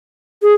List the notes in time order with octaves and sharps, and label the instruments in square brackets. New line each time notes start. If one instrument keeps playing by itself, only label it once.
[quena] G#4